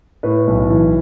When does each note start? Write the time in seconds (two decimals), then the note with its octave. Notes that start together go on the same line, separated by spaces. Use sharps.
0.23 A2 B4
0.47 B1
0.70 E3